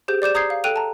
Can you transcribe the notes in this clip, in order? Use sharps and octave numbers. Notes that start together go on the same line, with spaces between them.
G4 G#4 C5 G6
D5 D6 G6 E7
A#5 D#6 G6 G#6 C7
F5
A4 G5 F#6 D#7 F7
A5 A#5